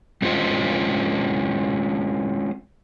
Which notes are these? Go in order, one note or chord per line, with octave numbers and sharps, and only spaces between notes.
G#3 C4 C#4 F4 C5 D#5